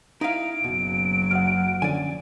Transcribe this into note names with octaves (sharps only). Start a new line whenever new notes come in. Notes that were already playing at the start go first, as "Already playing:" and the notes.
D#4 E4 F5 D7
F#1 B2 F#3
F#2 F#5 F6
D3 F3 C#4 D5 G#5